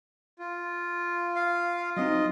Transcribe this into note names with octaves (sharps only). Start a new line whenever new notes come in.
F4
F5
F#3 C4 D#4 D#5